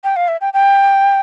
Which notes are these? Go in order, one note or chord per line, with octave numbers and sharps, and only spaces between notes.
G5
F5
E5
G5
G5